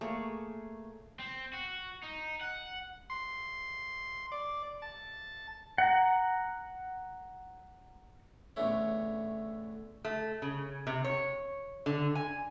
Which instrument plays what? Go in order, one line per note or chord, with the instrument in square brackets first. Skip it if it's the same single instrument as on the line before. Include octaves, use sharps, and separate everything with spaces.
[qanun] A3 A#3 G#4 C#5
[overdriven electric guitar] C4
F#4
D#4
F#5
[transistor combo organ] C6
D5
A5
[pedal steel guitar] F#5 A#5
[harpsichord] E2 A2 D3 A3 C#4
[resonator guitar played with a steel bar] A3
C#3
C3
C#5
D3
G#5